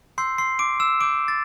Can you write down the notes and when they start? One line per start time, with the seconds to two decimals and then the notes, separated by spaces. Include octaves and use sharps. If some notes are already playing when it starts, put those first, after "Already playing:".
0.18 C6 E6 G6 C7
0.38 C6 C7
0.59 D6 D7
0.80 E6 E7
1.00 C6 D6 E6 G6 D7
1.28 A6